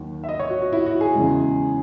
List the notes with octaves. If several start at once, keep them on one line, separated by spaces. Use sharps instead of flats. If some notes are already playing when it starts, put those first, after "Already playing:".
Already playing: D#2 D#3 F#3
E5
D#5
C#5
F#4
F#4
E4
F#4
G#4
E2 C#3 G#3